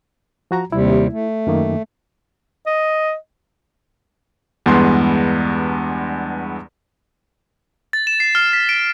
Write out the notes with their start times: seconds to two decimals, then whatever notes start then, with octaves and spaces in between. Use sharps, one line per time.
0.51 F3 F#4 A#5
0.72 D#2 C3 G3 E4
1.13 A3
1.47 F#2 D#3 A#3
2.66 D#5
4.66 E2 G2 G#3 B3 C6
7.93 A6
8.07 E7
8.20 C7
8.35 F6
8.53 B6
8.69 D7